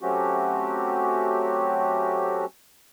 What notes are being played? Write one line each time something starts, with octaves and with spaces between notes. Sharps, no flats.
F#3 A3 C4 C#4 F#4 G4